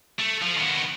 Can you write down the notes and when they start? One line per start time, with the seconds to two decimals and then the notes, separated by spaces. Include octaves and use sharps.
0.19 A3
0.42 F3
0.57 D#3 B3